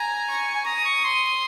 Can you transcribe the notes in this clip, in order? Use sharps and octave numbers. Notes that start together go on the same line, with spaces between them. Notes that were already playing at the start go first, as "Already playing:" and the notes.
Already playing: G#5 A#5
C#6
G#5
A#5 D#6
C#6
C6